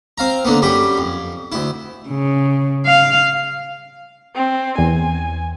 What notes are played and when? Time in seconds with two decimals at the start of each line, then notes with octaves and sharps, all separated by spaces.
0.18 C4 F5 A#5
0.45 D3 A#3 B3
0.62 F#2 G3 G4 B5
0.98 F2
1.52 D2 E4
2.09 C#3
2.86 F5
4.35 C4
4.78 E2 G#5